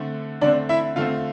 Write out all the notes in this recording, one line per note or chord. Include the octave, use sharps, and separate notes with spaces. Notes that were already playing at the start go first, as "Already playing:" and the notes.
Already playing: D3 A3 C4
D3 A3 C4 D4 D5
E4 E5
D3 A3 C4 F4 F5